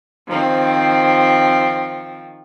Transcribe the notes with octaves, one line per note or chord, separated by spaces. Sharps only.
D#3 F3 C4